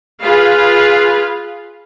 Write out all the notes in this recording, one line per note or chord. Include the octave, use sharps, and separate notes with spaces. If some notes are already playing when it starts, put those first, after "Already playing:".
F4 G#4 B4 F5